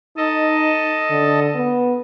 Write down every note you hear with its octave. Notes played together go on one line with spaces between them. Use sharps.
D#4 A4 D#5
D3
B3